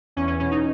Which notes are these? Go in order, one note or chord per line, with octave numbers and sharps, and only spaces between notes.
E2 C#4
C#4
B2 C#4
D#4